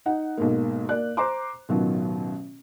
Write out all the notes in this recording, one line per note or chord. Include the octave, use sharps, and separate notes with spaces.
D#4 F#5
B1 G#2 A#3
A#3 D5 F#6
C5 A#5 C6 D6
A1 B2 D#3 F#3 F4